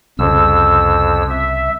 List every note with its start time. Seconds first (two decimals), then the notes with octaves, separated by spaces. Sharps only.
0.19 C2 F2 C#3 E6
1.30 E5